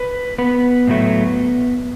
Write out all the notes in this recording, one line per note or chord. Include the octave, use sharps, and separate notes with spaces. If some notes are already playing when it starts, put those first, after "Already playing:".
Already playing: B4
B3 B4
A2 F#3 A3